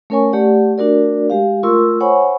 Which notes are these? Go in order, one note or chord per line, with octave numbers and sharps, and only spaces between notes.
A3 C#4 A#4 C#5 G#5 C#6
A3 G4 D5 F#5
A3 D4 F#4 A#4 D5
G#3 G4 F5
A3 F4 A#4 C6 C#6 E6
C5 C#5 F#5 G#5 B5 C#6